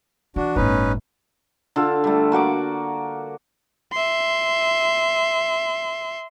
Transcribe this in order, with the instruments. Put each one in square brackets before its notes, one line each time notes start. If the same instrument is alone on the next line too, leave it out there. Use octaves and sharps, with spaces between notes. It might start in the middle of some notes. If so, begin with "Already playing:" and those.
[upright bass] E3 [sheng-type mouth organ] D4 F#4
[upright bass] G1 A2 [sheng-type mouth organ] C#4 D#4 B4
[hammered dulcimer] D3 F4 A4
G3 A3
A#3 F#4 D5 D6
[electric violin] E5 C6